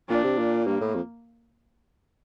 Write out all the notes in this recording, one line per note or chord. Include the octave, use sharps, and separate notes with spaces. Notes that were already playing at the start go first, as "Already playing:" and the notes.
A#2 D4
C3
A#2
G2 A#3
A2
F2